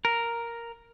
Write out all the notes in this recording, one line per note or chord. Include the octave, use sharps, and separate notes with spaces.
A#4